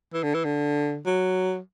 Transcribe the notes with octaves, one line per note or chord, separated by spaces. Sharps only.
E3
D3
E3
D3
F#3